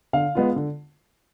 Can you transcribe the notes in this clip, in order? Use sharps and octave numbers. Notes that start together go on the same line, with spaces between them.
D3 F5
G#3 B3 F4
D3